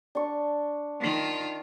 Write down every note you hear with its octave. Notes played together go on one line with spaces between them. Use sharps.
D4 C#6
D#3 F4